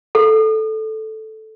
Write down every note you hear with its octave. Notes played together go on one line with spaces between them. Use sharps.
A4